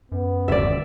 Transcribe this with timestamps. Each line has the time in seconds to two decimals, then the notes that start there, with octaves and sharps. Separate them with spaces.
0.12 F#2 B3
0.48 D#1 D2 D5 E5